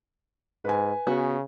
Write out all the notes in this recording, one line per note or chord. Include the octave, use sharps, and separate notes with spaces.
G#2 B4 G#5
C#3 B3 F#4